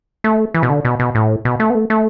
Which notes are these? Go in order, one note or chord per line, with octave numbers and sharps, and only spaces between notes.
A3
E3
B2
D3
B2
B2
A2
B2
A3
B3
A3
A3